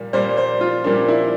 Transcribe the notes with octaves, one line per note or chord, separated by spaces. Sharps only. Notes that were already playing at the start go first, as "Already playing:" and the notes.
Already playing: A#2 G3 A#3
A#2 G3 A#3 C5
C5
F4
A#2 G3 A#3 D4
E4